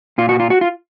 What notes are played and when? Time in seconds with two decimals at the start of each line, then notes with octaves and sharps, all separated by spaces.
0.18 A#2 F4
0.29 F#4
0.40 F4
0.50 F#4
0.61 F4